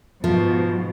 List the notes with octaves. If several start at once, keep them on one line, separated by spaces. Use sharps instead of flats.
G#2 B2 F3